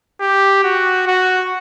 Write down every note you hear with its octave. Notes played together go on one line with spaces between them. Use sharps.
G4
F#4
F#4